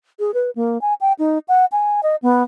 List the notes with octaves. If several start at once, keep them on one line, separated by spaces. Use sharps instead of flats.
G#4
B4
A#3
G#5
G5
D#4
F#5
G#5
D#5
B3